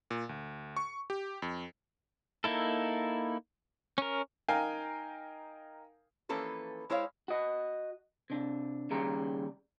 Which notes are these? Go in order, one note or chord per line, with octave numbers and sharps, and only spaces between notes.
A#2
D2
C#6
G4
F2
A#3 D#4 E4 A4
C#4 A#4
D#4 A#4 F5 G5 G#5
E3 F3 A#3 C#4 A4 B4
G#3 E4 C5 C#5 D#5 F5
F#4 D#5
C3 D4
D#2 C#3 G3 A#5